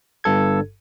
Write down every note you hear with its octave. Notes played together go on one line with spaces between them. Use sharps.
G1 G2 A4 G#6